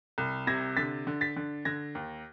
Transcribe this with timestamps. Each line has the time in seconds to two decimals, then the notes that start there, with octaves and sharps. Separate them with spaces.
0.18 C2
0.47 C3 G#6 A#6
0.77 D3 A6 B6
1.07 D3
1.21 A6 B6
1.36 D3
1.65 D3 G#6 A#6
1.95 D#2